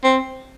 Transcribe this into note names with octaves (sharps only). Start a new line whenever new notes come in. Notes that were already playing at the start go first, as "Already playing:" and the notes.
C4